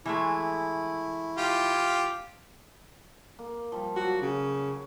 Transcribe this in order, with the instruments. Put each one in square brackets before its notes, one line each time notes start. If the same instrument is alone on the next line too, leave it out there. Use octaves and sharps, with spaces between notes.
[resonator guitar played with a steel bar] E3 G#3 A3 [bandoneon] E4
[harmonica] F4 G4
[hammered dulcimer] A#3
F3 G3
[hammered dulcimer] F#3 [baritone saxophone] F#4
[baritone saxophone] C#3